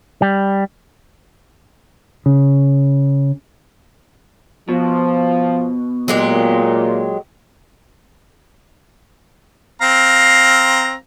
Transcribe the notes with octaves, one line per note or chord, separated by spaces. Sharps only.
G3
C#3
B2 F3
A#2 F#3 G#3 G4
C4 F5 A#5